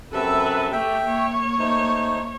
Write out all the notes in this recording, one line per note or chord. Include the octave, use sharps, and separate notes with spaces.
F#2 C3 A4 B4 E5
A3 G4 E5 G5
A#3 C#5
A3 D#4 C5